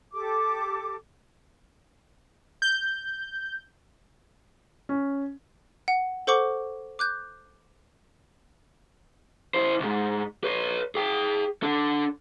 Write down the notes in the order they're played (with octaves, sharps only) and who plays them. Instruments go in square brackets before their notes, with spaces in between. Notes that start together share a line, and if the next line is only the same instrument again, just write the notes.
[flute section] G4 A4 D6
[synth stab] G6
[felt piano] C#4
[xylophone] F#5
A4 C5 F#5 C#6 D6 F#7
D6 F#6 G6
[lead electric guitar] E4 C5
C#2 G#2
B4 C#5
G#4 G5
D4 A4